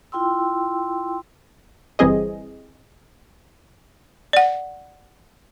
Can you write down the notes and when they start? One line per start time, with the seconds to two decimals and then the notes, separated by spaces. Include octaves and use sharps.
0.12 E4 F4 G5 C6 E6
1.99 G1 E3 G3 C4 G#4 D#5
4.33 D5 F#5